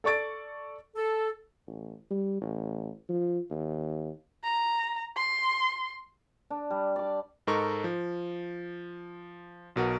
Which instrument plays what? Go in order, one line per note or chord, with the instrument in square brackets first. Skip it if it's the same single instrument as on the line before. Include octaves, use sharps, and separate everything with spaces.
[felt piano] A4 D5 C#6 A6 D7
[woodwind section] A4
[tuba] A1
G3
A1
F3
D#2
[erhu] A#5
C6
[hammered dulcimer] D4
G3
D5 D6
[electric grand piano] G#2 D#4 A4 A#4 C#6
F3
B1 B2 A#4 F#5